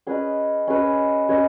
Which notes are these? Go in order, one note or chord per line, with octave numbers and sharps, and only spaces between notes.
C#4 G#4 B4 D#5
C#4 G#4 B4 D#5
C#4 G#4 B4 D#5